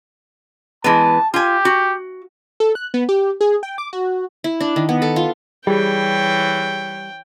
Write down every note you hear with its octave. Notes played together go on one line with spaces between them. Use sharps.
E3 G#3 B3 A5
F4 G4 G#5
F#4
A4
F#6
B3
G4
G#4
G5
D6
F#4
E4
D4
D#3
B3
A4
F4
E3 G3 G#4 C#5 G5